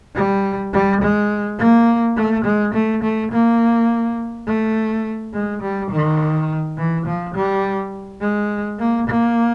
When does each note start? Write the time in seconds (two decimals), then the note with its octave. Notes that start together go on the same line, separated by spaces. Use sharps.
0.15 G3
0.73 G3
1.01 G#3
1.59 A#3
2.17 A3
2.45 G#3
2.74 A3
3.03 A3
3.32 A#3
4.47 A3
5.33 G#3
5.62 G3
5.91 D#3
6.77 E3
7.06 F3
7.35 G3
8.21 G#3
8.79 A#3
9.07 A#3